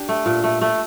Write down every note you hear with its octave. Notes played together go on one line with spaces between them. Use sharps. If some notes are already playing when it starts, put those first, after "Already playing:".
Already playing: D4 G4
A3
A#2
A3
A3